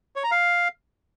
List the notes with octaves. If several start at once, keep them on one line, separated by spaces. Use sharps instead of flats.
C#5
A#5
F5